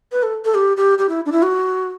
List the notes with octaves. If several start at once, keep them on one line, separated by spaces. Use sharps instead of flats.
B4
A4
A4
G4
G4
G4
E4
D4
E4
F#4